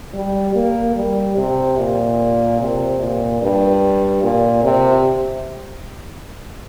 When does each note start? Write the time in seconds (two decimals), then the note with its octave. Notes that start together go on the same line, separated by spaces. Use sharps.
0.14 G3
0.55 A#3
0.96 G3
1.37 C3
1.78 A#2
2.60 C3
3.01 A#2
3.42 G2
4.23 A#2
4.63 C3